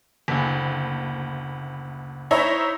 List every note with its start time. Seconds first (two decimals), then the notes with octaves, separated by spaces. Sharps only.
0.28 F#1 D2
2.31 D#4 E4 C5 C#5 E5 A#5